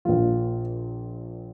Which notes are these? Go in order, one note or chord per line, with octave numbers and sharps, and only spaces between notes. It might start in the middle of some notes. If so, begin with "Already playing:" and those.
A#1 A#2 F3 F4